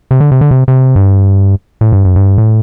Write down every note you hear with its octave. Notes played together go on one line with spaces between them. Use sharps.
C3
D3
C3
D3
C3
C3
G2
A2
G2
F#2
G2
A2